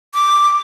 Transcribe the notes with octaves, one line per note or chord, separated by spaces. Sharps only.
D6